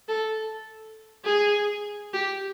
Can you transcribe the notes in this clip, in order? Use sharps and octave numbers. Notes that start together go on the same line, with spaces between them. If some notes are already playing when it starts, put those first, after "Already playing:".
A4
G#4
G4